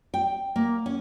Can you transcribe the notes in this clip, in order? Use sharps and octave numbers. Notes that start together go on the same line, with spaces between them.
G5
A#3
C#4